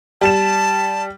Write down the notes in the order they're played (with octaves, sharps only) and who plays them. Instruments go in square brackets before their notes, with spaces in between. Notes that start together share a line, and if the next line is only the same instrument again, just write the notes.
[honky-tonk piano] G3 E7 [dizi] A5